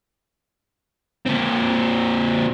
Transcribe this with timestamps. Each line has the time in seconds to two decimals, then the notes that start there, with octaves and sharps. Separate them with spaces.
1.26 A#2 C4